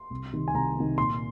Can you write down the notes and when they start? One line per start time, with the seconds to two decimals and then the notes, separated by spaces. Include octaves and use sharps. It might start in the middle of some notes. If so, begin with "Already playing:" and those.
Already playing: C6
0.10 C2
0.33 C3 D#3
0.48 G#5
0.54 C2 A#5
0.76 C3 D#3
0.98 A#2 C6